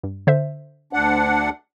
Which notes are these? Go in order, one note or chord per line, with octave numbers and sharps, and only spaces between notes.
G2
D3 C5 E5
D2 D4 F#5